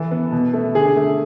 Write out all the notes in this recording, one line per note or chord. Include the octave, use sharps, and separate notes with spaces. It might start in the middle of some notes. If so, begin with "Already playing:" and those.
Already playing: E3 A4
B3
B2
A3
D3 G#4
A3